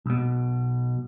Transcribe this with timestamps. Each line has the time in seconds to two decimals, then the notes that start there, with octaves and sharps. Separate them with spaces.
0.06 B1 B2